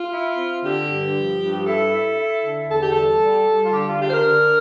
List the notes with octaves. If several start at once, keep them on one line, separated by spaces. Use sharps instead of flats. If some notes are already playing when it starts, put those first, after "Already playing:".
Already playing: F4
E4
C4
D3 G4
G2
F3
G2
E4 A4
E4
E4
D3
E2 A4
G4
G3 A4
G3
G3
F4
D3 G4
F4
D4 G4
C5
A#4
D3